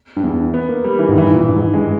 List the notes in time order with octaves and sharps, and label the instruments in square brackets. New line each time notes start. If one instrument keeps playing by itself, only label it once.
[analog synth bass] G2
E2
[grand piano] B3
A#3
G3
E3
[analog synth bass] G#2 [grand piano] D#3
[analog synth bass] G2
[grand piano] E3
[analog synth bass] A#2
G2
G#2
[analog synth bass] G2 [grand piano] G#3